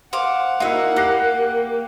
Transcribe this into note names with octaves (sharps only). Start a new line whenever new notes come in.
C5 F5 F#5 D6
A#3 D#4 E4 F#4 A#4 F5
G4 F#6 A#6 C7